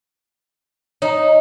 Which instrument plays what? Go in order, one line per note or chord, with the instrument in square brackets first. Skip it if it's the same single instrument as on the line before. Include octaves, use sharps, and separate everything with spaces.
[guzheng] D#4 [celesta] C#5 A#5